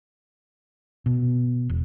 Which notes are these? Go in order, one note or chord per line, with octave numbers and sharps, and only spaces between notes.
B2
E1